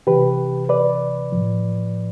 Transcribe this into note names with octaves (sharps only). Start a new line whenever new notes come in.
C3 E3 G4 B4
B4 D5
A2 F3